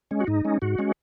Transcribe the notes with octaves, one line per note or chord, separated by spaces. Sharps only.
G#3 C#4
F#4
G#2 D#4
G#3 C#4
G#2 F#4
G#3 C#4